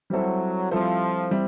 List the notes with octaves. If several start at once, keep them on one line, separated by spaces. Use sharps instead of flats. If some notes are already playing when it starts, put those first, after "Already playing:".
F#3 G3 C4 E4 A4 C5
F3 G3 C4 E4 A4 C5
G3 C4 E4